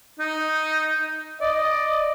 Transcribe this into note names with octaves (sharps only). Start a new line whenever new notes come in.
D#4
D5 D#5